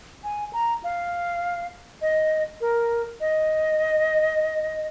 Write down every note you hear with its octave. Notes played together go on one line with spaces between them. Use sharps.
G#5
A#5
F5
D#5
A#4
D#5